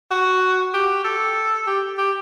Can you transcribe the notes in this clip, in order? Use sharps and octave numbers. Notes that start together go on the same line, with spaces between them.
F#4
G4
A4
G4
G4